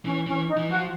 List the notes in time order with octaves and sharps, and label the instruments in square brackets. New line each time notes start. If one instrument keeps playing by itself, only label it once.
[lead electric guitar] E3 [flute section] C#4
[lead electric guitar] E3 [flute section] C#4
[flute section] D#4
[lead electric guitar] E3
[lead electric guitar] F3 [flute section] F#4